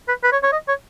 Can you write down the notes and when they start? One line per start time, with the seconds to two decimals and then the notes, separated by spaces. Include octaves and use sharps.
0.08 B4
0.23 B4
0.33 C#5
0.43 C#5
0.52 D#5
0.69 C#5